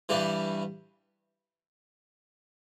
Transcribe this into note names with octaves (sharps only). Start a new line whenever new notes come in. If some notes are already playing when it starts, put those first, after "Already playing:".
G2 E3 G3